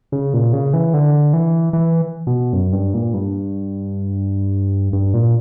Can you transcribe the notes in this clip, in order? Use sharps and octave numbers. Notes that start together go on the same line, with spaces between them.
C#3
A#2
C#3
E3
D3
E3
E3
B2
F#2
G2
A#2
G2
G2
A#2